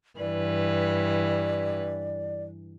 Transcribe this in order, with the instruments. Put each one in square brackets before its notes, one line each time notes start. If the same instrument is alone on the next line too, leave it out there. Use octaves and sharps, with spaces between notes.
[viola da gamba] G2 E3 B4 [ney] D5